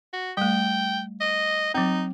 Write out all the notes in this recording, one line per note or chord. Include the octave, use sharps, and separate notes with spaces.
F#4
G3 A3 G5
D#5
F#3 C4 D#4